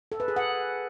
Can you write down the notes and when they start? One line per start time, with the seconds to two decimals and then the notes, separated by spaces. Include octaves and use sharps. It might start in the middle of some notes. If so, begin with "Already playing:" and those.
0.12 A4
0.20 B4
0.28 G#4
0.36 F#5